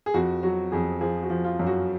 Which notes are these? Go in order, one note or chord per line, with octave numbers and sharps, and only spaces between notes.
G#4
F2 F#4
F#3 F#4
F2 G#4
F3 G#4
F#4
F3
F4
F#2
F#4